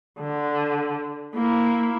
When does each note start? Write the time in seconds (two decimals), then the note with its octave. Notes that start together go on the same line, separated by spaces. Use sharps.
0.20 D3
1.35 A#3 E4